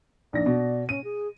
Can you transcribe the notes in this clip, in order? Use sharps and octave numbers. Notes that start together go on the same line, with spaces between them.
A#1 D#4 D5 A#6
B2
C#4 D#7
G#4